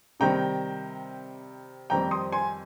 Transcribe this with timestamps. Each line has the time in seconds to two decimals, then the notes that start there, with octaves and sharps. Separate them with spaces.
0.20 C3 D#3 G3 C4 G5 A#5
1.90 F2 D#3 G3 C4 G5 A#5
2.11 C6 D#6
2.32 G#5 C6